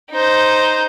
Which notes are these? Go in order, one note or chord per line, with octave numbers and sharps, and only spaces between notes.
D#4 C5